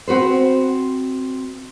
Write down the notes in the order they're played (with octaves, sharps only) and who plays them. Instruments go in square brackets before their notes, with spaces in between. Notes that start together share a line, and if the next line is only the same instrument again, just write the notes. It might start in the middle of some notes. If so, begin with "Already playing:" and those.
[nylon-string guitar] C4 F#4 B4 C5